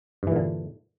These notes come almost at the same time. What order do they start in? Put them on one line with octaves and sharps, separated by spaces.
G2 E3 A#2 D3